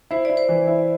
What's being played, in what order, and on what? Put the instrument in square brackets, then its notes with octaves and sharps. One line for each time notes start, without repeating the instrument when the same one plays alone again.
[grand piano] E4 [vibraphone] C5
[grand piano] E4 [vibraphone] D5
[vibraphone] C5
[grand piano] E3
E4